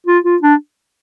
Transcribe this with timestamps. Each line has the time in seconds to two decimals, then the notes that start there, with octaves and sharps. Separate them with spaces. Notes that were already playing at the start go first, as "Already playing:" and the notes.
0.06 F4
0.24 F4
0.42 D4